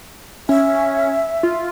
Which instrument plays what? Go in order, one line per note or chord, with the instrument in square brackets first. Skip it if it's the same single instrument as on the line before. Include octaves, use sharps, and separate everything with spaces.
[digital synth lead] C#4 [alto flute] E5
[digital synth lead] F4